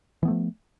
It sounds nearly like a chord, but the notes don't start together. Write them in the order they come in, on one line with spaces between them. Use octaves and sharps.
E3 B3 A3 F3